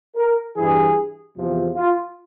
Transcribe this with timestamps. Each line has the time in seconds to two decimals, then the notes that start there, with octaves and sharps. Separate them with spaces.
0.16 A#4
0.56 G2 E3 G#4
1.36 E2 C3 F3
1.76 F4